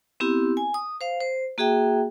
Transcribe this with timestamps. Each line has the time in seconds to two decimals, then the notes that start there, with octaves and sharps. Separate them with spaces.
0.20 B3 C4 E4 G4
0.57 G#5
0.74 D#6
1.01 C5 F5
1.20 C5
1.58 A#3 F#4 G#4 E5 G5